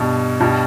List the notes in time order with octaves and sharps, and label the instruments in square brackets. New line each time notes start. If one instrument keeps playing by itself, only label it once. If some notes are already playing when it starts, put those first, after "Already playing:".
Already playing: [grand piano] G2 B2
G2 B2